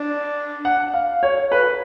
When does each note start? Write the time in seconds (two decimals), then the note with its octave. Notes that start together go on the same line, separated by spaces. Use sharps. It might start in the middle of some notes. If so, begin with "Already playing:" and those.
Already playing: D4
0.65 F#5
0.94 F5
1.23 C#5
1.52 B4